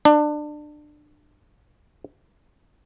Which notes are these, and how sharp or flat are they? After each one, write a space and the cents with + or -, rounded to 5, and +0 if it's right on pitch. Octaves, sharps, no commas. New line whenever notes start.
D4 +25